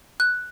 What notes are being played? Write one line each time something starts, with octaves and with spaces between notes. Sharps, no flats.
F#6